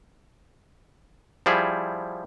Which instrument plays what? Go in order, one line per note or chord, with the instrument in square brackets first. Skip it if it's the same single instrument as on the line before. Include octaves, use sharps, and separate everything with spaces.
[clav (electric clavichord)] F3 G3 E4 G#4